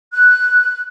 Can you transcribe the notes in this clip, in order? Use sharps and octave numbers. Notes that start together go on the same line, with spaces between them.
F#6